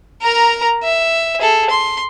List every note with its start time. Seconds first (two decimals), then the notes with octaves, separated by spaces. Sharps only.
0.22 A#4 A#5
0.83 E5
1.39 G#4 A4
1.70 C6